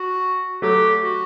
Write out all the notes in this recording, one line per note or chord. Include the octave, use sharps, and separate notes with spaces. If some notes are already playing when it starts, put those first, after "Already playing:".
Already playing: F#4
F#3 A3 G4
F#4